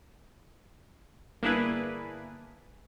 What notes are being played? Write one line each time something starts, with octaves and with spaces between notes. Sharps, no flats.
G1 A#3 D4 E4 G#4 B4